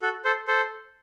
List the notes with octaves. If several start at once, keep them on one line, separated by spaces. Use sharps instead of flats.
F#4 A4
A4 C5
A4 C5